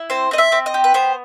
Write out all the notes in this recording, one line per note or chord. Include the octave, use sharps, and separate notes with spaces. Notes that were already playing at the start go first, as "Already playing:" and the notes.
Already playing: E4
C4 C5
C4 D#5
E5
C4
D#5
G4
B4
B3 C5